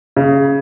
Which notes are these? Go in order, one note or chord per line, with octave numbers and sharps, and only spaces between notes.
C#3